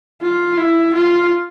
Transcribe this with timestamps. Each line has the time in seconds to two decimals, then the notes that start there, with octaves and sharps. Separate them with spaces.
0.22 F4
0.57 E4
0.95 F4